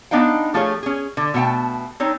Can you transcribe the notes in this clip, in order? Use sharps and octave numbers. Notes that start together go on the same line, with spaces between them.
B3 D4 D#4 F5 G5
F3 A3 F4 G4 G#4 C#5
C#4 G#4
D3
B2 A3 F#5 G5 A5
C4 D4 D#4 C#5